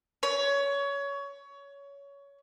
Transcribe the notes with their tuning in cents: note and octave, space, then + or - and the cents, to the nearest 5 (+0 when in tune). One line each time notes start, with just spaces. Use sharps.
C#5 +20